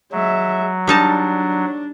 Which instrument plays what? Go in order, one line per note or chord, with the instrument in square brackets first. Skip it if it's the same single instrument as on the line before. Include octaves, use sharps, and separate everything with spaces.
[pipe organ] F#3 [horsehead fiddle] G#3 E5
[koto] G3 D#4 A5 [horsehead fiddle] D4